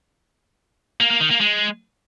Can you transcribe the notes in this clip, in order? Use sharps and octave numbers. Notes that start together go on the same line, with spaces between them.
A#3
A#3
D#3
A#3
G#3